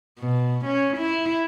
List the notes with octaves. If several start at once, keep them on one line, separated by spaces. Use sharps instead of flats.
B2
C#4
E4